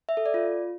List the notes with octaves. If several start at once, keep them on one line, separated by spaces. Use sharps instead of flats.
E5
A4
D5
F4